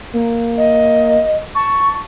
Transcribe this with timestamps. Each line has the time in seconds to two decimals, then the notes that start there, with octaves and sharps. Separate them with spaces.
0.13 A#3
0.57 D#5
1.55 A5 C#6